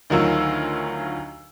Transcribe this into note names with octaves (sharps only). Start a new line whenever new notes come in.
D2 D#3 F#3 F4 E6